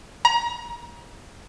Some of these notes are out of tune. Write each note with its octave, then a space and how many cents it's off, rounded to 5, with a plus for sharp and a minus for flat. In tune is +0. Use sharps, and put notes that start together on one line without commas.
A#5 +30